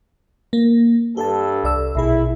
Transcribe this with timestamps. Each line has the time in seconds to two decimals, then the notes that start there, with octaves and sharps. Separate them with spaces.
0.53 A#3
1.17 G2 G4 A4 A5
1.64 C2 D5 E6
1.95 A#1 B2 E4 G#4